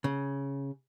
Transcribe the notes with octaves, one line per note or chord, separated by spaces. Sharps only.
C#3